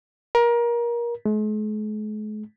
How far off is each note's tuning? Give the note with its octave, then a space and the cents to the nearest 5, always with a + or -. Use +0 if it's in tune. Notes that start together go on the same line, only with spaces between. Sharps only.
A#4 +25
G#3 +45